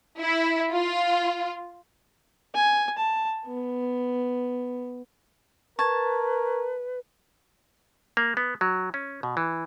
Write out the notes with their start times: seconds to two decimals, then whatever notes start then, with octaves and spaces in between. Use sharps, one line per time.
0.20 E4
0.71 F4
2.55 G#5
2.98 A5
3.46 B3
5.79 A#4 B4 A5 C#6 G#6
8.17 A#3
8.37 B3
8.61 F#3
8.94 C#4
9.23 B2
9.37 E3